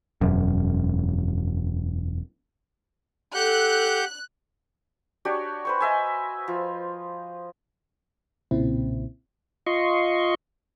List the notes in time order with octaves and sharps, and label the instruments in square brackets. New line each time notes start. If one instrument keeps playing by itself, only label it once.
[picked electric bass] E1 F#2
[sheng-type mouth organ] G4 F#5 G6 [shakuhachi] A4 [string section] F#6
[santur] D4 F#4 G4 C#5
B4 C5 C#6
D#5 E5 G#5
F3
[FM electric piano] B1 A#2 C#3 C4 E4
[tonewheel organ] F4 D#5 C6 C#6